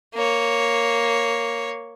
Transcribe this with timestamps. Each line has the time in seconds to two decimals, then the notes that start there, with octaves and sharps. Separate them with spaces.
0.14 A#3 C#5